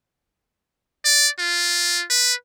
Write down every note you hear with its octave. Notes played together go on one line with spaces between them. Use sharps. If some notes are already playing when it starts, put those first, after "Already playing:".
D5
F4
B4